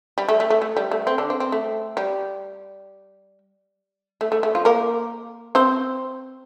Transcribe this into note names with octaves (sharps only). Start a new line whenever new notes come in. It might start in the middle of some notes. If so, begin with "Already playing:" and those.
G3
A3
A3
A3
A3
G3
A3
C4
D3 D4
C4
C4
A3
G3
A3
A3
A3
F3 F4
A#3 A#4
C4 C5